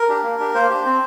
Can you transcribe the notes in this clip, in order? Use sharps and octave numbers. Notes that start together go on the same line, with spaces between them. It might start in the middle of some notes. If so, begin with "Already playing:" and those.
Already playing: A#4
D4 G4
A#3
D4 G4
A#3 C5
D4 G4
C4